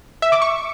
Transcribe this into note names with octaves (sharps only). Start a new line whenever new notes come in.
E5
D6
C#6